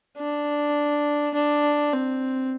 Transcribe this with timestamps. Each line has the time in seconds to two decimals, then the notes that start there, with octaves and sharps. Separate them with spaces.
0.17 D4
1.34 D4
1.93 C4